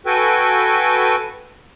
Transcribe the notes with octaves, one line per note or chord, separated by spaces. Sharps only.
F#4 A4 B4 G5 G#5